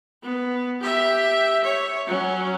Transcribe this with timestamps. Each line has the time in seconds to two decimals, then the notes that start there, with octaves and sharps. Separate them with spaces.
0.23 B3
0.81 G4 E5
1.64 C#5
2.07 F#3 C#4